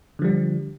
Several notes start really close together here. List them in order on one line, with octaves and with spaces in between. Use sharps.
D3 F3 G3